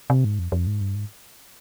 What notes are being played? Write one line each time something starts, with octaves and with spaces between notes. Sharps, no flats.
C3
G#2
F2
F2
G#2
G2
G#2